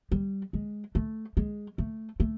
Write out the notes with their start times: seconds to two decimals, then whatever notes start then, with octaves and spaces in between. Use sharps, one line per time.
0.12 G3
0.53 G#3
0.95 A3
1.37 G#3
1.78 A3
2.20 A3